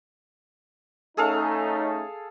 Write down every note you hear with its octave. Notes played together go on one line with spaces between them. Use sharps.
A3 C#4 D#4 G#4 A4 F5